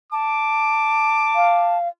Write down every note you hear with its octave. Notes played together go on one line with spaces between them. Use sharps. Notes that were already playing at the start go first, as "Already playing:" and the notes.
A5 D6
F5